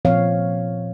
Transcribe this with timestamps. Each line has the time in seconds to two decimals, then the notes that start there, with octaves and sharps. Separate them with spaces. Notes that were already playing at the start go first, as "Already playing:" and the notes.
0.05 A#2 F3 C4 C#5 F5